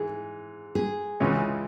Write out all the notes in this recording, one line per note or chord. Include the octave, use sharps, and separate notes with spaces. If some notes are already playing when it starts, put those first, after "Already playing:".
Already playing: G#2 E3 G#4
G#4
C#2 C#3 E3 G#3 C#4